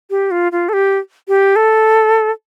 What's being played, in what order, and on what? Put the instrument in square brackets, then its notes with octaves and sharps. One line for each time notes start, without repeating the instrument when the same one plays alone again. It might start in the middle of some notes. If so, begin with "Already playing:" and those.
[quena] G4
F4
F4
A4
G4
G4
A4